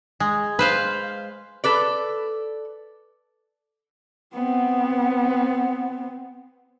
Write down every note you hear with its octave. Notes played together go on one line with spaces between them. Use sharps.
G#3
B4 C5 F5
A4 B4 D5
B3 C4